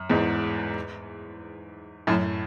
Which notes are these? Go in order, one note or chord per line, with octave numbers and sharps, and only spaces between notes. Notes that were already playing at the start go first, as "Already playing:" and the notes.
Already playing: F#2
E2 G#2
F#2 A2